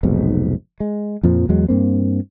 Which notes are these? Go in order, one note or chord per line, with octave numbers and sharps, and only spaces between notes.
F1 B1 G#2
G#3
F2 A#2 F3
E2 F#3 G#3
G2 A#3 C4